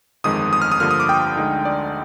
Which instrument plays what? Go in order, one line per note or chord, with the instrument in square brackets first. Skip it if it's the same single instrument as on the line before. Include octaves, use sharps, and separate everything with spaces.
[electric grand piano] G1 F2 D#3 G#3 D#6
D#6
F6
D#6
G2 D3 F3 A#3 F6
D#6
D6
G5
D2 D3 G#3 D#4
D5